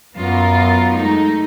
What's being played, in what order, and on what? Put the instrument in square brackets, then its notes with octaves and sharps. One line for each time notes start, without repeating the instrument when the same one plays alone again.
[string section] F#2 [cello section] B3 F4 A#4
[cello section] G#3 A3 D#4